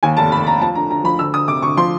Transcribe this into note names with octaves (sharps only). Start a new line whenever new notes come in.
D#2 G#5
F1 A5
F1 B5
F1 A#5
F3 A5
D3 A#5
D2 A#5
F3 B5
D2 E6
D2 D#6
C3 D6
D2 C#6
F3 C6